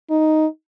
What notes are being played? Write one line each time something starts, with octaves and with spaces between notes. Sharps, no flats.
D#4